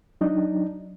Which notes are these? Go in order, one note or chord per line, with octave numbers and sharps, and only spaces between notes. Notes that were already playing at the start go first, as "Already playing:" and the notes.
F#3 D4 D#4